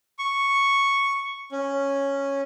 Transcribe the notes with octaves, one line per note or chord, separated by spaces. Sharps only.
C#6
C#4